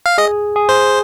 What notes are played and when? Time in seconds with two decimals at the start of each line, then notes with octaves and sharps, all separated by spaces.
0.06 F5
0.18 G#4 D#5
0.56 G#4
0.69 C5